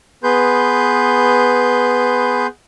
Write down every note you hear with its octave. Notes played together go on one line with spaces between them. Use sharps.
B3 G#4 B4 C6 G6